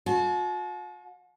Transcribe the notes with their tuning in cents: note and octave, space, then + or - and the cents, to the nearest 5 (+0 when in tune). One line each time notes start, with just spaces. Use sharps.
F#4 -45 A5 -45